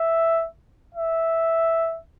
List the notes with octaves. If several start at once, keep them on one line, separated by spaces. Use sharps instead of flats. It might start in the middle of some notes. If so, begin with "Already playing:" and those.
Already playing: E5
E5